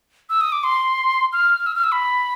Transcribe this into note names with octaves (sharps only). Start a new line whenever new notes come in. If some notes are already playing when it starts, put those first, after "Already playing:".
E6
D#6
D6
C6
F6
E6
F6
E6
B5